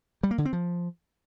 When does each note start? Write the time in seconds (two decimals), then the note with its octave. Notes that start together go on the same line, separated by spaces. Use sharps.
0.23 G3
0.31 A#3
0.38 D3
0.45 C4
0.53 F3